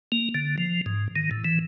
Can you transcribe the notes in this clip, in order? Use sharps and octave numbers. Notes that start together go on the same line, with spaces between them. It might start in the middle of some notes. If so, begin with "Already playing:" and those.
A#3
D3
F3
G#2
D#3
A2
E3